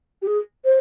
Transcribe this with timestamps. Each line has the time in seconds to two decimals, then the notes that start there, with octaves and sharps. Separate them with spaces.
0.22 G4
0.27 G#4
0.65 C5